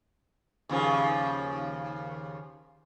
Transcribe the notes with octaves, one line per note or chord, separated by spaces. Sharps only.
D#2 C#3 F3